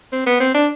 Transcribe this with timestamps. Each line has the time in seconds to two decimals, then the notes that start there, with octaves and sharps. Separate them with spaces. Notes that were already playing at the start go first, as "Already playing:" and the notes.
0.12 C4
0.26 B3
0.40 C4
0.54 D4